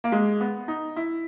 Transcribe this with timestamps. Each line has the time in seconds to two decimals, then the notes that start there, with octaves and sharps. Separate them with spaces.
0.04 A#3
0.12 G#3
0.41 B3
0.68 D#4
0.96 E4